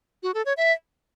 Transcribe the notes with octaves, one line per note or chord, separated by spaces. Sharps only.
F#4
A4
C#5
E5